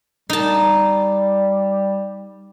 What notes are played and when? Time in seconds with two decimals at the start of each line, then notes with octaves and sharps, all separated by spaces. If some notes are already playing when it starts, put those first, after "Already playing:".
0.30 G3 D#4 A5